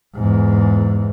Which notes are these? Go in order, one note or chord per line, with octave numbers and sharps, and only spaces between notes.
E2 G#2